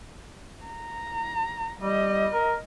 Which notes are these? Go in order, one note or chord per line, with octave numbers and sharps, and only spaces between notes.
A#5
G3 D#5
A#4